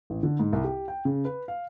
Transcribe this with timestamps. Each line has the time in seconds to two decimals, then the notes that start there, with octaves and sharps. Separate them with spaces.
0.10 A1
0.23 D3
0.39 G#2
0.53 C2
0.64 G4
0.88 G5
1.05 C#3
1.25 B4
1.48 F5